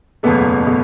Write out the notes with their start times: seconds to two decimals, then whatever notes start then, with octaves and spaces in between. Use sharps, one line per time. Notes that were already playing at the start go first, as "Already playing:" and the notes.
0.23 F#1 E2 B2 A3 B3
0.66 B2 A3